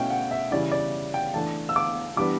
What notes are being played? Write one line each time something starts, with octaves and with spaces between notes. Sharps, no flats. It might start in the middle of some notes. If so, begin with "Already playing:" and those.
Already playing: B2 A3 C#4 E4 G5
F#5
E5
C#3 E3 G3 C#4 E4 D5
D5
G5
E3 A3 D4 A5
E6
D6
E3 G3 B3 D4 D6